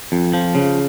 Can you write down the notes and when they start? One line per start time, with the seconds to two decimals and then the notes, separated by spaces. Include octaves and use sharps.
0.12 F2
0.34 F3
0.55 C#3